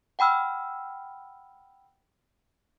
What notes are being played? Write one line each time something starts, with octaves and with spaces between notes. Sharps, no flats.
F#5 G5 B5 E6 F6